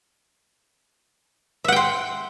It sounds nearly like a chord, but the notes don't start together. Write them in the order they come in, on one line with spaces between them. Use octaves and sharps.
E5 F#5 G5 C6